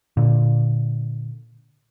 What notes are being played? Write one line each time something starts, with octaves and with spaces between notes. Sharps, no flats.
A#2 D3